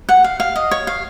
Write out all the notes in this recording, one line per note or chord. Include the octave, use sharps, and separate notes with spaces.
F#5
F5
F5
D#5
C#5
F5